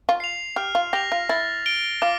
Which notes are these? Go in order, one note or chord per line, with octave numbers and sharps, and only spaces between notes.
F4
C7 F7
G4 F6
F4
G4 A#6 F7
F4
E4 A6
D7 G7
F4 D6